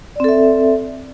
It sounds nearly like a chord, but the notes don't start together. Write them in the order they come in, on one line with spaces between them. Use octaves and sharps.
D5 C4 A4 E5